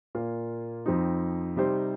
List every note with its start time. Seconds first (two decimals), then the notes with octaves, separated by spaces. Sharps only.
0.15 A#2 A#3 F4
0.86 F2 F3 C4 D#4
1.56 C3 G3 D#4 C5